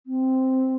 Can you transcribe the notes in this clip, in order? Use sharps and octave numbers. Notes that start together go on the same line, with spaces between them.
C4